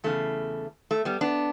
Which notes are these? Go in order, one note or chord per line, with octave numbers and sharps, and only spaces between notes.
E2 C#3 E3 A3
A3
G3 B3
B3 D4